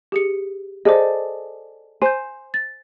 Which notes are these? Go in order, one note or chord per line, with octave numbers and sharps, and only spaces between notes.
G4 G#4 C#7
G#4 A4 C5 D5 D#5
C5 G#5 G6
A6